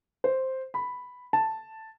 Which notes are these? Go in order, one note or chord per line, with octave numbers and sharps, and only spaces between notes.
C5
B5
A5